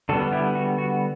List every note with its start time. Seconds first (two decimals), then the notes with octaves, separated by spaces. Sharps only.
0.09 D3 G3 B3 F#4 A4
0.32 E4 G4
0.55 F#4
0.78 F#4